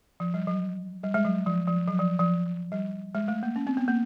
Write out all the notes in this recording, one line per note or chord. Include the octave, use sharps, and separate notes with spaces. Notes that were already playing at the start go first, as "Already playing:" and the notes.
F3
G3
F#3
G3
G#3
F#3
F3
F3
F#3
F3
F3
G3
G#3
A3
A#3
C#4
C4
B3
A#3